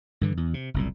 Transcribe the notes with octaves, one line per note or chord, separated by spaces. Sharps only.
G2 D3 E3
E2
C3
F#1 C2 A#2